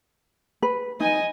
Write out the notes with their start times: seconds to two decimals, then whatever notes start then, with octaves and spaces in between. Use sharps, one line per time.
0.63 B4
1.01 D#4 D#5 G#5